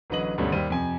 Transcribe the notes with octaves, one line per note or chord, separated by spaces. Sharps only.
A1 D3 F#3 B4 D#5 F#7
D2 G2 B2 G3 A3 C#4
D#2 G3 C5 D#7
F2 C3 G#5